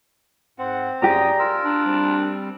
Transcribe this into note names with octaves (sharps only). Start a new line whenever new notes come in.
G#2 C4 F#5
F#2 G4 G#4 D5 G5 A#5 D#6
F4 A#4 E6
D4
G3 C4